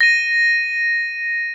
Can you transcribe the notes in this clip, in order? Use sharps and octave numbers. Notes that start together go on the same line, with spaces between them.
A#6 D#7